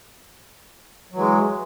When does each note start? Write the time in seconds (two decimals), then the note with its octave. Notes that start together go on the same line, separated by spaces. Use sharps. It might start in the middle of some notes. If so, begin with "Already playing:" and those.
1.12 F#3
1.15 E3
1.18 G#3